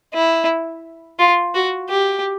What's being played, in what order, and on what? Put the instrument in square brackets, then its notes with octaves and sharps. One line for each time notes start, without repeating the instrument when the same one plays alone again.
[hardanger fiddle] E4
F4
F#4
G4